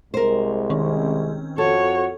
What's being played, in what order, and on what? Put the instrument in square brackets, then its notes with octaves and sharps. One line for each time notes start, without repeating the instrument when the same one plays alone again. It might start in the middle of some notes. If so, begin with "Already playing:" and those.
[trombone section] C2 G#3 [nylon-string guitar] A#4 C5
[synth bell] D#3 C4 C#4
[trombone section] F2 F#4 [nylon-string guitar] A4 [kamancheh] C#5